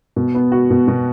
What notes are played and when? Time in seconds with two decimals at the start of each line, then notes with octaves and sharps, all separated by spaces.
0.16 B2
0.34 B3
0.52 F#4
0.70 B2
0.88 B2